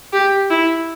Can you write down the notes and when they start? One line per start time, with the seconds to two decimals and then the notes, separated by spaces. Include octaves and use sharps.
0.13 G4
0.50 E4